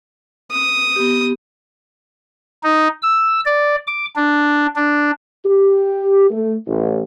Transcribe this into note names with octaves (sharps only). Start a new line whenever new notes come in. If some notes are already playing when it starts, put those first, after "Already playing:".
D#6
B3 G4
D#4
E6
D5
D6
D4
D4
G4
A3
A1